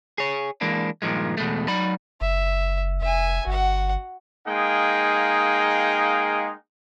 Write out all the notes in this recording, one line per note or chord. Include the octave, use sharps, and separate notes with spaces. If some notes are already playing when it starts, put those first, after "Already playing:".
G#4 C#5
E3 G#3 A#3 D4
G2 A#2 D3 D#3 F3 G#3
E2 B2 G#3 A3
F#3 D#4 D5 B5
F#1 E5
F1 E5 G#5
G1 F#4 F#5
G#3 A#3 D#4 G#4 F5 G5